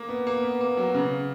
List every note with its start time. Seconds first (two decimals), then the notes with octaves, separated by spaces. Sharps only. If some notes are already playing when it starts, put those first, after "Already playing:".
Already playing: A#3
0.09 B3
0.27 A#3
0.43 B3
0.61 A#3
0.77 F#3
0.94 C#3